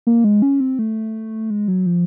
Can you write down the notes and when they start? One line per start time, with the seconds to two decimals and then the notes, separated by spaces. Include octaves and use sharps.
0.07 A#3
0.24 G#3
0.42 C#4
0.60 C4
0.79 A3
1.50 G#3
1.68 F#3
1.86 F3